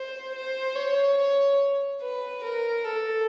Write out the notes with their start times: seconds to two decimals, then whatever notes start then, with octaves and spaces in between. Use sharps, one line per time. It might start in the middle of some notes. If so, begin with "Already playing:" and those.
Already playing: C5
0.35 C5
0.76 C#5
1.17 C#5
2.01 B4
2.44 A#4
2.84 A4